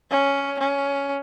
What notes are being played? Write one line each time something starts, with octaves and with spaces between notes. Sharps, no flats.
C#4
C#4